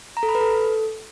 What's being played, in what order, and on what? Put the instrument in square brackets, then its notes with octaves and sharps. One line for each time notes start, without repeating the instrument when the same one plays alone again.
[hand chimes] A#5
A4
B5
B4
A4